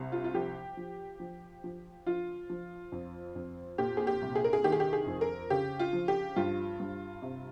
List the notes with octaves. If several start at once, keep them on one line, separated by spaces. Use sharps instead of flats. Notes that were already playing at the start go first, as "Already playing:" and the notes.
Already playing: C2
F4
F4
F3 G4
F3
F3
F3
F3 F4
F3
F2
F2
A#2 G4
G#4
G4
C2
G#4
A#4
G#4
D#3 G4
G#4
G4
G#4
F2
A#4
C#3 G4
F4
F3
G4
G2 F4
G2
C3